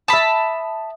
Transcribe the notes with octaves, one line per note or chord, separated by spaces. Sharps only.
E5 A5 B5 D#6